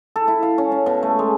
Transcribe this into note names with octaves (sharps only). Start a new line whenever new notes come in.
A4
E4
F5
C#4
C#4
B2
A3
G#3